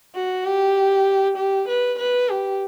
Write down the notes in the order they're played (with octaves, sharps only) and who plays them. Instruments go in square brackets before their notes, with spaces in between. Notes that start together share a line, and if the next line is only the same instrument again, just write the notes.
[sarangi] F#4
G4
G4
B4
B4
G4